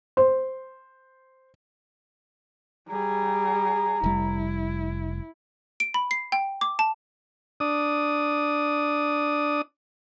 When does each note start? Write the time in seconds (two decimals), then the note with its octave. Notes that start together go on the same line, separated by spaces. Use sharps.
0.17 C5
2.89 G3 G#4 A#5
4.04 F1 G3 E4
5.80 D7
5.94 B5
6.11 C7
6.32 G5
6.61 D6
6.79 A5
7.60 D4 D#6